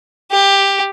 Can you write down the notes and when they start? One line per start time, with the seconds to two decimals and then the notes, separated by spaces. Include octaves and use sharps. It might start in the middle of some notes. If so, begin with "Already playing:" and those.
0.32 G4